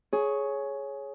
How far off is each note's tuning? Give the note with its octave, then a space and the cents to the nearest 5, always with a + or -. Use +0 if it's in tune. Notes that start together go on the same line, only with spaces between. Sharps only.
G#4 +15 C#5 +0